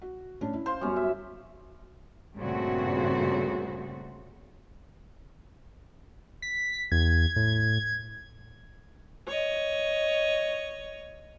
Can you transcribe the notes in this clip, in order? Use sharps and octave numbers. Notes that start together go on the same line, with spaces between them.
F#4
A2 C#4 D4
E4
C5 F5 C6
F#2 G3 B3 C#4
E5
G2 A#2 C#3 A3 C4 F#4
B6
E2 G#6
A2
C#5 D#5